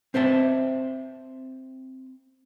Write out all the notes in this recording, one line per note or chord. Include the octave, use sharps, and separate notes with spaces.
C4 C5 E5 A5